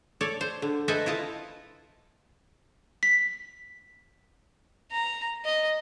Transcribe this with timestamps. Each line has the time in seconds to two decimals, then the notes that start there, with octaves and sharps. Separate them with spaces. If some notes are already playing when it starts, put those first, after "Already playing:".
0.21 A4 C#5 D5
0.41 C5
0.62 D3
0.88 A4 B4 C5 D#5 E5 G#5
1.06 E4 F4 D#5 A5
3.03 B6
4.91 A#5
5.45 D#5